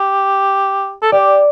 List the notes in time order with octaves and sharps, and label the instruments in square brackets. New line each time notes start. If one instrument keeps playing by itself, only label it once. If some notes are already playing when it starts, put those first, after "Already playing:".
Already playing: [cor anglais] G4
A4
[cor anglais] G4 [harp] D5